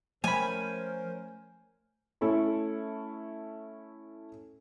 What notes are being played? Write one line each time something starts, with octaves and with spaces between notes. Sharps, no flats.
F3 A3 C#4 A#4 C5 G#5 B5
A3 C#4 E4 A4